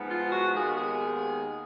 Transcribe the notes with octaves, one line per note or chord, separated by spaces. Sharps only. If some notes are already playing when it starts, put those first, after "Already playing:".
Already playing: G#2 F3 B3
F4
F#4
D#2 D#3 G#3 B3 G#4
G#4